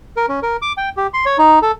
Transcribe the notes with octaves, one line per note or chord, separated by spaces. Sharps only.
A#4
C#4
A#4
D6
G5
G4
C6
C#5
D#4
A4